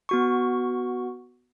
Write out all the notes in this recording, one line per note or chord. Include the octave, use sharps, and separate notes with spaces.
B3 F#4 C#6